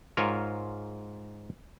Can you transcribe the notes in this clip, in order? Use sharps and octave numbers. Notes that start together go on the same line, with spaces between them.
G#2 F4 A#4 C#5